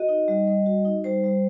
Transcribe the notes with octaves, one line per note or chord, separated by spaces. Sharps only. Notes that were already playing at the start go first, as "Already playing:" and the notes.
Already playing: F#4 D#5
D#4
G3
G3
F#4
D#4
G3 C5
G3